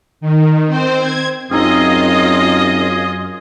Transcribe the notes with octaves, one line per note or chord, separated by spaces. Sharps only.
D#3
C4 C5
G#6
F#2 C4 D#4 F4 G#4 D#5